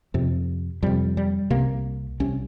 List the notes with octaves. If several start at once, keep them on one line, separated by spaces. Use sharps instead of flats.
F2 C3
F2 C3 G3
G3
C2 C3 A#3
C2 C3 C#4